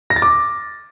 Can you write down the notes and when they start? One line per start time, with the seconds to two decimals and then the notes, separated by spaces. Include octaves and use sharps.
0.10 A#6
0.16 A6
0.22 D6